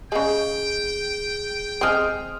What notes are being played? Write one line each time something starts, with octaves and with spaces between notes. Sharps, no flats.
C#3 G#3 G#4 G5
G#3 C4 C6 D#6 F6